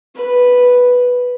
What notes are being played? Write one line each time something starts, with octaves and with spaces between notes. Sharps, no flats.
B4